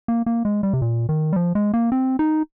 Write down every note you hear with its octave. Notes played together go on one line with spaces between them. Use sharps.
A#3
A#3
G#3
G3
C3
A#2
D#3
G3
F3
G#3
A#3
C4
D#4